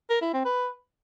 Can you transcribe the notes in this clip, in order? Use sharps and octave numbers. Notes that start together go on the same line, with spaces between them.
A#4
E4
C4
B4